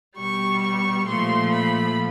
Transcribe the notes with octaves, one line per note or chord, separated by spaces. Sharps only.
B2 G3 C#6
C#6
A#2 F3 A3 C6
B5